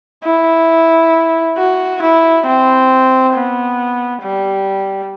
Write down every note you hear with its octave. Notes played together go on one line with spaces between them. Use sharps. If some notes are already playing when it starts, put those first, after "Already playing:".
E4
F#4
E4
C4
B3
G3